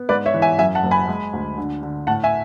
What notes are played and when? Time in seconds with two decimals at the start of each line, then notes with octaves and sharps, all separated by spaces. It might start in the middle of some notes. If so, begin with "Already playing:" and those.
Already playing: B3
0.09 G#2 B4 D5
0.26 C#5 E5
0.34 E3
0.42 E5 G#5
0.59 F#2 E5 G#5
0.75 F#5 A5
0.83 F#1
0.91 G#5 B5
1.08 G#3
1.33 D2
1.58 D3
1.83 D3
2.07 A2 F#5 A5
2.24 E5 G#5